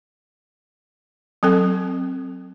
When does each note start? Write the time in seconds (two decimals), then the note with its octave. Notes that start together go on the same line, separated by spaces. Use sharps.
1.43 F#3 C4 A4 G5